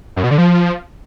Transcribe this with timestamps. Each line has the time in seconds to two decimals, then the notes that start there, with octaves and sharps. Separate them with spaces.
0.16 F#2
0.24 B2
0.31 D3
0.38 F3